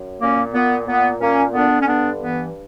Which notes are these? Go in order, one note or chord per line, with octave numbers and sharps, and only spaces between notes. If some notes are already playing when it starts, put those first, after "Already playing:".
Already playing: F#2
A#2 A#3 C#4
A#2 B3
A#2 B3
A#2 A#3 C#4
D3 B3 D4
C#4
G2 B3 D4
E3 B3